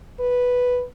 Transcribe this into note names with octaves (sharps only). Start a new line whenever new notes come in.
B4